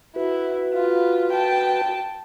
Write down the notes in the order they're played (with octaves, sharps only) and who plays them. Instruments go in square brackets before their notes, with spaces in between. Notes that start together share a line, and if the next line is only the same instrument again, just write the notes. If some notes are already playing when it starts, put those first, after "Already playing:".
[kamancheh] E4 [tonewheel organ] F#4 B4
[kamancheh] F4
G5 A5